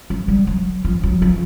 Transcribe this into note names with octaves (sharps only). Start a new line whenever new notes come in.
F#3
G3
F#3
F3
F#3
F3